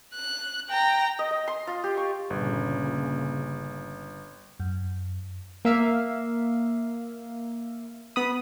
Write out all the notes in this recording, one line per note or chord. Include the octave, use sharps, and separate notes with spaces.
F#6
G5 A#5
D#5
D#5
C6
F4
G4
C#6
G1 A#2 C#3
F#2
A#3 E5 F5
B3 B5 D#6